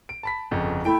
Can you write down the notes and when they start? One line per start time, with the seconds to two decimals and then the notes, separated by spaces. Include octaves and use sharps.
0.09 D7
0.23 A5 B5 B6
0.51 G1 F2 C#3
0.85 A3 E4 G5 D7